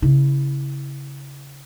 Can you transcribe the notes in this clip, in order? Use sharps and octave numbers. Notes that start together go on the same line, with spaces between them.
C#3 E4